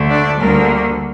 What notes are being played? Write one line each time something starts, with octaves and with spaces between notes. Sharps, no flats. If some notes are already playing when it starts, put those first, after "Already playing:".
Already playing: D2 D3 A3
D4 D5
D2 D3 G3 A#3 A#4